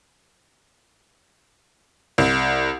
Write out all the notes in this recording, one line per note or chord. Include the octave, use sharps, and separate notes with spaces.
C2